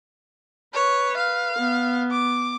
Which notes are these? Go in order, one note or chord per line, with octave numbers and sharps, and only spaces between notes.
B4 C#5
F5
B3
D6